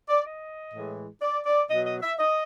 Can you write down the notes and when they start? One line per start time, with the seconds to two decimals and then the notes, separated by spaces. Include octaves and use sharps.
0.09 D5
0.26 D#5
0.74 A2 E3 G#3
1.22 D5
1.46 D5
1.71 B2 F#3 D#5
1.87 D#5
2.03 E5
2.19 D#5